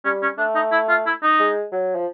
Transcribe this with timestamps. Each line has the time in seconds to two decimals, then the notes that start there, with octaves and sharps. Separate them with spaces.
0.05 G3 C#4
0.22 C#4
0.38 A3 D4
0.55 D#4
0.72 E4
0.89 F4
1.06 E4
1.23 D#4
1.39 G#3
1.72 F#3
1.96 F3